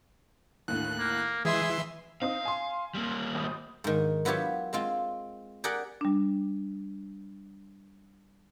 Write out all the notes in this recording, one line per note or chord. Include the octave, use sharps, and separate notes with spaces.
D#2 A2 D3 F#6
A#3
E3 G#3 G#4 E5 C6
C4 D#4 F5 D#6
G#5 C6
G3 A#3
G#1 D#6
G#2 D#3
F#3 B3 E4 F4 G4 C#5
G#3 C4 F4
G4 G#4 A#4 D5 F#5
G3 D4